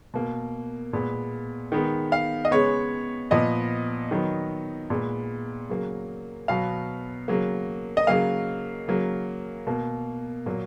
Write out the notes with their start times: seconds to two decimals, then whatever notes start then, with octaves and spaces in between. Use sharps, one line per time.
0.14 B2 A#3
0.93 A#2 G#3 B3
1.72 D#3 G#3 B3
2.12 F5
2.45 D#5
2.51 C#3 G#3 B3 C#5
3.31 A#2 F3 B3 D#5
4.11 D#3 F#3 B3
4.90 A#2 G#3 B3
5.69 C#3 F#3 A#3
6.48 B2 F#3 B3 F5
7.28 C#3 F#3 A#3
7.97 D#5
8.07 C#3 F#3 A#3 F5
8.88 C#3 F#3 A#3
9.67 B2 A#3
10.46 A#2 F#3 A#3